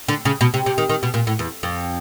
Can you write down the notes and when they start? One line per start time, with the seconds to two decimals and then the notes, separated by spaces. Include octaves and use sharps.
0.08 D3
0.25 C#3
0.41 B2
0.54 C3
0.66 C3
0.78 D#3
0.89 D#3
1.03 B2
1.14 A#2
1.27 A2
1.39 E2
1.63 F2